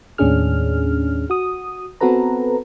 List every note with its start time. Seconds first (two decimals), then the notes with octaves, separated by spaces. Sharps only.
0.18 D#2 A2 C#4 D4 G#4 F6
1.30 F#4 D#6
2.01 B3 C4 F#4 A4 B4 A#5